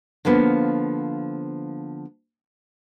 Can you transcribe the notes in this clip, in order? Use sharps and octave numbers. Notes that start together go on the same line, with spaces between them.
D3 F3 A#3 B3